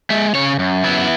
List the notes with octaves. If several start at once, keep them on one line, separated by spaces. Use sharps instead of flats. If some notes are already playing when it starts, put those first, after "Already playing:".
G#3 E5
C#3 C#5
F#2
B3 E4